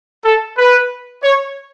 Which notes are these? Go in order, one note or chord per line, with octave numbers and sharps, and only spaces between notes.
A4
B4
C#5